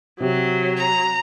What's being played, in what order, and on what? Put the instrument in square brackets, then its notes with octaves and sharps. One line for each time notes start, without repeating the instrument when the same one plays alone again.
[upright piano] C3 G4 [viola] F#3
[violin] A#5